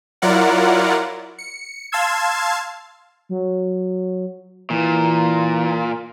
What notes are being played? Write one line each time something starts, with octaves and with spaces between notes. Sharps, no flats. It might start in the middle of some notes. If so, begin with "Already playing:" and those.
F#3 E4 F4 A#4 D5 F#5
C#7
F5 A5 C6 E6 G#6
F#3
A#2 E3